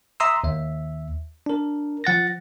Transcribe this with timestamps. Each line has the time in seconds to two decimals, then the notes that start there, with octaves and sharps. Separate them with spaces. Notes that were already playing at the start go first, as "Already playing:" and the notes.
0.20 E5 A#5 C6 D#6 E6
0.44 D#2 E5
1.46 D4 A#4
2.04 F3 F#5 A6 A#6